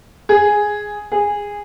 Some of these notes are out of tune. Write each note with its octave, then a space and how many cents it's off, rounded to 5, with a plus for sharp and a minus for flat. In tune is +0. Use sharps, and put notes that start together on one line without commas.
G#4 +0
G#4 -15